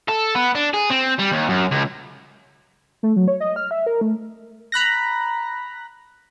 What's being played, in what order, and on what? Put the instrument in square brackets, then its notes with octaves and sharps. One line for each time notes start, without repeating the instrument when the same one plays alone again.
[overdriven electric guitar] A4
B3
D4
G#4
C4
G3
D#2
F#2
C#2
[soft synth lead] A3
F#3
C#5
D#5
F6
E5
A#4
A3
[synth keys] A#5 B5 F#6 A#6